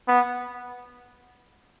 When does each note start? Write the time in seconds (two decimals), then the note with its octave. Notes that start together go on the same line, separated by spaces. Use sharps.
0.08 B3